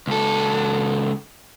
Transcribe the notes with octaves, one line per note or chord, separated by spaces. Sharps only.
C#2 A4